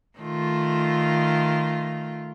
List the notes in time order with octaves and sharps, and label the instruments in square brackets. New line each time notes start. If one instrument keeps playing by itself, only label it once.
[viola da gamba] D#3 A3 F4